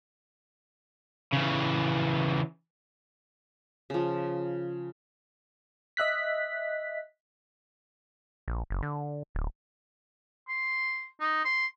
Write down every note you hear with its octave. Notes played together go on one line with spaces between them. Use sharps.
C#3 E3
C#3 F3
D#5 E5 F#6 B6
A#1
F#1
D3
D1
C6
D#4
C6